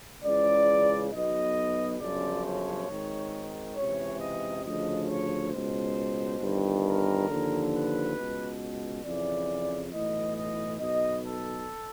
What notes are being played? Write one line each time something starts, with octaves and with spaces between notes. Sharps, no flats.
C#2 C#3 E3 D5
B1 B2 D#5
G1 F#2 C#3 F3 D5
C#5
G#1 G#2 D#3
C#2 C3 E3 C#5
D#5
D2 C#3 F3 D#5
C#5
C#2 B2 C5
G1 G2 D#3
A#4
D#2 D3 F3
B4
C#2 B2
F2 C#3 E3 D5
B1 A2 E3 D#5
D#5
B1 B2 D#5
A4